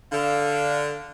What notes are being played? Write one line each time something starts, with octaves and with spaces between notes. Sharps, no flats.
D3 F5